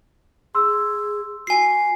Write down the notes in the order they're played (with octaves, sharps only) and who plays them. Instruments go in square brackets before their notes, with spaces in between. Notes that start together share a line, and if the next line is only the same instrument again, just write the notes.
[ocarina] G#4 [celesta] C6 E6
[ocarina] F#4 [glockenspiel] G#5 C7